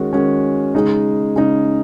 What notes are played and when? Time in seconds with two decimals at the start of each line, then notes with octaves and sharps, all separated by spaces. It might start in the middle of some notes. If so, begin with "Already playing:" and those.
Already playing: D#3 G#3 C#4 F#4
0.12 D#3 G#3 C#4 F#4
0.74 C#3 G#3 D#4
1.36 C#3 G#3 D#4